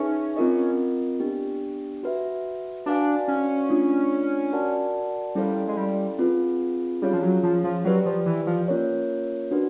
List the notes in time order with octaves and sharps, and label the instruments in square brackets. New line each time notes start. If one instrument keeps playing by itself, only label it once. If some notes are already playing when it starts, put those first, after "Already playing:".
Already playing: [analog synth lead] C#4 [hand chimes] D#4 G#4 B4 E5 G#5
[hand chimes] C4 F4 A#4 D#5
B3 D4 G4
F#4 B4 E5
[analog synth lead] D4 [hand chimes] F#4 B4 D5 F5 G#5
[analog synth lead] C#4
[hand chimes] A3 D4 F4
F#4 A#4 D5 F#5 A5
[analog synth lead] G3 [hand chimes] C#4 E4 A4 C5 F5
[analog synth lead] G#3
G3
[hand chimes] C4 F4 G#4 B4
[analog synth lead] G3 [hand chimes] C#4 F4 G#4 C#5 F5
[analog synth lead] F3
F#3
F3
F3
[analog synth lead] F#3 [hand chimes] G4 B4 D5
[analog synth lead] F3
E3
F3
[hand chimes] A#3 C#4 F4 A#4 C#5
D4 F#4 B4